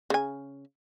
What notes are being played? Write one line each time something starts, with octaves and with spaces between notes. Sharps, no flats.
C#3 G#5